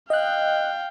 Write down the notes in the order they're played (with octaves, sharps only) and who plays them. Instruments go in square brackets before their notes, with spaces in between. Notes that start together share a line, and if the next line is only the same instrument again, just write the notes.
[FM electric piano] D#5 F#6 [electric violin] F5 G5